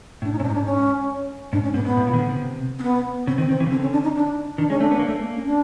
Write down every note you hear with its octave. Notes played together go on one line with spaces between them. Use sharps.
A2 D4
D#4
A2 C#4
G#2 D4 D#4
D4
C#4
G#2 D4
C#4
G#2 B3
G#2 B3
A2
A#2
D#3
D3
C3
C4
B3
C#3 C4
D#3 C4
D#3 C4
E3
C#3
D3 C4
C#4
D4
D#4
D4
D#3 D4
G#3 C#4
A3 D4
B3
A#3
A3
A#3
C#4
D4